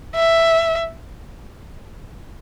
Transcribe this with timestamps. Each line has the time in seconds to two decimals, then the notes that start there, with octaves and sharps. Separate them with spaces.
0.15 E5